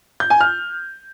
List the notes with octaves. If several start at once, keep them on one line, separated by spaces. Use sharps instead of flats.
G6
G#5
F6